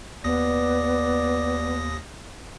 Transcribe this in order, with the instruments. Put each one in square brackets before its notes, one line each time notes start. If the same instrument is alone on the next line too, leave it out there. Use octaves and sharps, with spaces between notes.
[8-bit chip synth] D#2 D#6 A#6 [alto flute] B3 [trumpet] D5